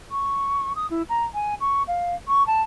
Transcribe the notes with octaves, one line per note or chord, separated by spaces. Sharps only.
C#6
D#6
E4
A#5
G#5
C#6
F5
C#6
A5